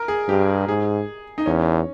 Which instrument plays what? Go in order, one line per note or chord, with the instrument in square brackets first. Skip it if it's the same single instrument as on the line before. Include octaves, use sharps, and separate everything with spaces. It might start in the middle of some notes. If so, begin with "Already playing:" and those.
Already playing: [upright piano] A#4
G#4
[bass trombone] G2 [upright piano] G4
[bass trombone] G#2 [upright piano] G#4
[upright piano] D#4
[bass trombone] E2 [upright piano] C#4